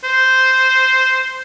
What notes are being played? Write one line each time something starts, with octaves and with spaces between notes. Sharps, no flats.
C5